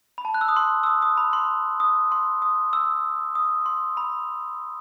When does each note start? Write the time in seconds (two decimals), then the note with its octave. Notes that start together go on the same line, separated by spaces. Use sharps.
0.18 B5
0.25 A5
0.34 F#6
0.41 E6
0.48 D#6
0.57 C6
0.83 E6
0.86 D#6
1.02 D#6
1.18 B5
1.33 C6
1.80 D#6
2.12 C6
2.42 D#6
2.73 E6
3.35 D#6
3.66 C6
3.97 B5